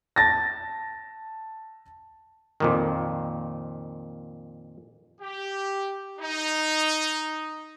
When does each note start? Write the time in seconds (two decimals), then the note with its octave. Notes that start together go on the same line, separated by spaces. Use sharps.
0.16 A5 A6 A#6
2.60 F2 A#2 D#3
5.21 G4
6.19 D#4